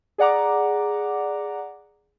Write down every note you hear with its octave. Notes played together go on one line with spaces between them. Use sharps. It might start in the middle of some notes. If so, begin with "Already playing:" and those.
G#4 D5 F#5 A#5 D6